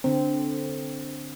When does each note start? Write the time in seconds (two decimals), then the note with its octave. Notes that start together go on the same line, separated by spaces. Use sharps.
0.04 D3 C4